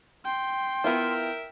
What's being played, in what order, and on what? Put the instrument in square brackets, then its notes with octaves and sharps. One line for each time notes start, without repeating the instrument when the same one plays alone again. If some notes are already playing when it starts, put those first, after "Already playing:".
[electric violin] G5 [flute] C6
[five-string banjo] B3 E4 F4 [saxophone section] A#4 E5